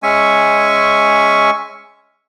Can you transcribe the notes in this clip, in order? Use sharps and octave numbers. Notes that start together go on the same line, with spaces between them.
G#3 C#4 E5 G#5 C#6